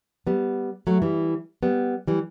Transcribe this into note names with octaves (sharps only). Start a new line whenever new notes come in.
G3 B3
F#3 A3
E3 G3
G3 B3
E3 G3